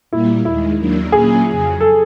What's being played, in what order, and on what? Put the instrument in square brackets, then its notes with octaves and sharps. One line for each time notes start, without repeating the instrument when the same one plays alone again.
[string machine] A#2 G3 A#3 [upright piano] E4
[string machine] D#2 D#3 G#3 [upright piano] E4
[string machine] D#2 D#3 F#3 A#3 D4
[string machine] A#2 F#3 A#3 C#4 F4 [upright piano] G#4
[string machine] F2 C#3 F#3
[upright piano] A4